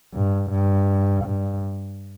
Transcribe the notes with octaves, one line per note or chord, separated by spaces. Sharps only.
G2
G2
G2